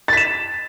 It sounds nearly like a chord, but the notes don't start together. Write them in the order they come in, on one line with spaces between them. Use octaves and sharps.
A6 B6 E7